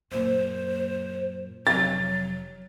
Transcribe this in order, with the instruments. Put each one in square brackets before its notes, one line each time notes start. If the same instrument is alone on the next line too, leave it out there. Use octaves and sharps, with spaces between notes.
[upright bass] F#2 A#2 [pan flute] C5
[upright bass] F1 [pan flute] F#3 [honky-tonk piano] A6